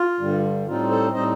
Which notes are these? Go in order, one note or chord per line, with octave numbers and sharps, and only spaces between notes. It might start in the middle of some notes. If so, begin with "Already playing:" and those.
Already playing: F4
G2 D3 G3
A2 G3 C4 D#4 F4
A4 C5
A2 G3 C4 D#4 C5 D#5